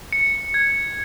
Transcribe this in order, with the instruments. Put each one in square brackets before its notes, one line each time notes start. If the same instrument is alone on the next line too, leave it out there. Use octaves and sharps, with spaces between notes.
[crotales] C#7
G#6